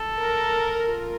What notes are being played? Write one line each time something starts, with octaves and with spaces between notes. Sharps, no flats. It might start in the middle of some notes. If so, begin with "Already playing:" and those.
Already playing: A4
A#4
F4